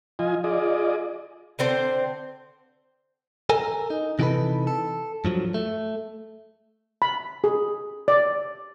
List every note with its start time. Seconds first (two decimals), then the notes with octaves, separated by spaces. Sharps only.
0.19 F3 F4 D#5 G#5
0.44 F4 G#4 D5 D#5
1.59 D3 C4 C5
3.50 A4 A#4 G#5
3.90 D#4
4.19 C3 E3 D#4 F#4 A4 B4
4.67 A4
5.25 G2 F3 F#3
5.54 A3
7.02 B5
7.44 G#4
8.08 D5